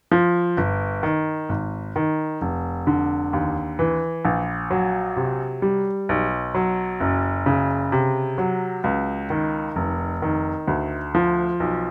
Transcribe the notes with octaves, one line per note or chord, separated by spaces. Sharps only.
F3
G1
D#3
G#1
D#3
F1
D3
D#2
E3
A#1
F#3
C3
G3
B1
F#3
F#1
C#3
C3
F#3
C#2
D#3
F1
D#3
D2
F3
B1